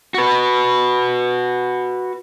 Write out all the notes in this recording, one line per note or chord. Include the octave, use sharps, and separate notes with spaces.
F#4 B4